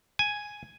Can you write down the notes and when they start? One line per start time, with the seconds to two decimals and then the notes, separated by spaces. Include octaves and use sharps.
0.19 G#5